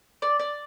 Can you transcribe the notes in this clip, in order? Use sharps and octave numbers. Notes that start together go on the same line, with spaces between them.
D5
D5